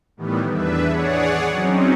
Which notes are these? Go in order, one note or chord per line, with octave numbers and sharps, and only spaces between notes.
A2 D#3 E3 G3 B3
E2 D4 B4 E5
G#4 C#5 D5 F#5
F#3 C4 C#4 D#4